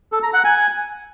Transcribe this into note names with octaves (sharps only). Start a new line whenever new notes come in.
A4
A#5
F#5
G#5